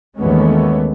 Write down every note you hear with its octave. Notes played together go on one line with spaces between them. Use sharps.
D#2 E3 G#3 A3 B3 C#4